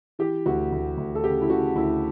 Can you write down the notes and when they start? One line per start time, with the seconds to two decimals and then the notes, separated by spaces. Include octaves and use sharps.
0.19 E3 G4
0.46 D2 F#4
0.72 D2
0.97 D2
1.15 A4
1.24 C#3 G4
1.41 E4
1.50 C#3 F#4
1.76 D2 E4